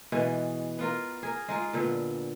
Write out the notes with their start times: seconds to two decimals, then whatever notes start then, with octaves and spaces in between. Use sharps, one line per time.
0.12 B2 E3 G#3 B3
0.79 B3 F4 A#4
1.23 G#4 A#4
1.48 G#3 D#4 F4
1.73 A#2 D3 B3